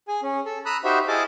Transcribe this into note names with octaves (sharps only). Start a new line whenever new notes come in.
G#4 G#5
C#4
A4
A#5 B5 D#6 E6 F#6
D#4 F#4 G4 C5 E5 B5
E4 G#4 D#5 F5 A5 D6